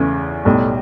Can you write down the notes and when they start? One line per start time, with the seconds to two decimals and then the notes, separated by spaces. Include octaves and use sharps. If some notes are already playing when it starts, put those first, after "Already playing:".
Already playing: E2 C#3 E3 A3 C#4
0.45 B1 A2 G3